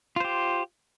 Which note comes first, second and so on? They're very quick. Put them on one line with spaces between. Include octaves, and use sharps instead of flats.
F4 C5 G4